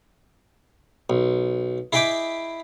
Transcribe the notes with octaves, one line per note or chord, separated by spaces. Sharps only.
B1
E4 G#4 D#5 G5 B5 D6